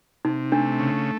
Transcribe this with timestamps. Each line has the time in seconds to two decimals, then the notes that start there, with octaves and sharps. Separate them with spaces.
0.25 C3 D#4
0.52 A3 D4
0.80 C#3